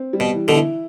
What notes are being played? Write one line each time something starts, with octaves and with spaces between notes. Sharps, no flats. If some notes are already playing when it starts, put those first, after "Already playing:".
Already playing: C4
G3
B2
E3
B2 D3
E4